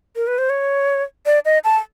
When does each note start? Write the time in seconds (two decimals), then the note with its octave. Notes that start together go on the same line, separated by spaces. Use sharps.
0.16 A#4
0.27 B4
0.38 C5
0.50 C#5
1.26 D5
1.45 D#5
1.64 A5